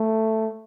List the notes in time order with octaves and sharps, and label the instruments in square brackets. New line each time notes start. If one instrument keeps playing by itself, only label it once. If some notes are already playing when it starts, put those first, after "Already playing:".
Already playing: [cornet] A3